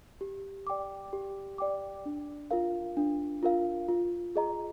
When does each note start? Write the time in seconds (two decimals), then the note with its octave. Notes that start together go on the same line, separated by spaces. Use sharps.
0.21 G4
0.67 D5 G5 D6
1.13 G4
1.58 D5 G5 D6
2.05 D4
2.51 F4 A#4 F5
2.97 D4
3.43 F4 A#4 F5
3.89 F4
4.35 G#4 D#5 A#5